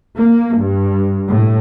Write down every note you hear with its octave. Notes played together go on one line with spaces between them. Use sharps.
A#3
G2
A2